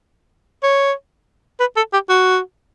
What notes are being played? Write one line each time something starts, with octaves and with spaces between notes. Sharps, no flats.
C#5
B4
A4
G4
F#4